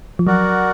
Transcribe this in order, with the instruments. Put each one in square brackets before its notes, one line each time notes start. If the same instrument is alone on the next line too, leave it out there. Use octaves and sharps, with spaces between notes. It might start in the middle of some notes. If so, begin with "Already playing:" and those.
[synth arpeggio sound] F3
[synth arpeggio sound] F#3 [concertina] F#4 A#4 D5 F#5